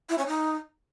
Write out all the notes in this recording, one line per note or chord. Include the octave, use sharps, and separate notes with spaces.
E4
C#4
D#4